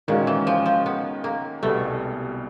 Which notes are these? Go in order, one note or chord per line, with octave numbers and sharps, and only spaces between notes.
A#2 D#3 G#3 C#4 F#4
E3
F3
F3
B3
A#3
C2 B2 G3 A3 B3